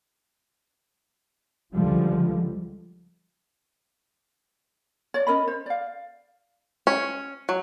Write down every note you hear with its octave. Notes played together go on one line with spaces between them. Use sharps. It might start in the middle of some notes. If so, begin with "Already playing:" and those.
C#2 D3 F3 G3 G#3
C#5 D5
C#4 A#4 D#5 B5
C5
D5 F5
C#4
F#3